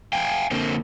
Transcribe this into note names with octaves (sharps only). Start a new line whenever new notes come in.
F5 G5 G#5
D3 A#3 C4